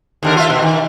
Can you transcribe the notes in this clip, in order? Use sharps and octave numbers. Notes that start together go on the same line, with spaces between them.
D#2 D3 A#4
F4 E5
B2
D#3